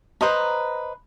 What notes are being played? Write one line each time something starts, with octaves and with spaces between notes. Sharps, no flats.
B4 C5 D#5 A#5